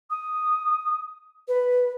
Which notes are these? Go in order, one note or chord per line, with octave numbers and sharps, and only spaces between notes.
D#6
B4